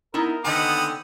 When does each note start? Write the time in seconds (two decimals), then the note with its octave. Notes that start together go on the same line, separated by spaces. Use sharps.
0.14 B3 D#4 E4 A#4
0.45 D3 D#3 B3 C4 F#5 G#5 D#6